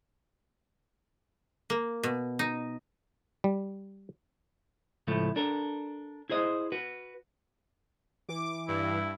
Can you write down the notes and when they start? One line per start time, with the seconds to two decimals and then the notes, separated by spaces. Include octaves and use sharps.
1.70 A#3
2.03 B2
2.39 D#4
3.44 G3
5.07 C#2 A2 F3 A3
5.36 D4 A4 A#4
6.30 E4 G#4 C5 D#5
6.72 F#4 B4
8.29 E3 D6
8.68 G2 E4